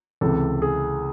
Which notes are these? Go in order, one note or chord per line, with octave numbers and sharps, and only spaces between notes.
C#2 C3 E3 A4
G#4